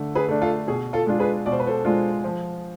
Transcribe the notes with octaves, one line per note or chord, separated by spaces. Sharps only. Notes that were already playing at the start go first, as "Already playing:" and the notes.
Already playing: D3 A3
G#4 B4
A3 D4
F4 A4
B2 G#4
F4 A4
G#3 D4 F4
G#4 B4
B2 D5
C5
B4
A4 C5
G#3 D4 F4
F3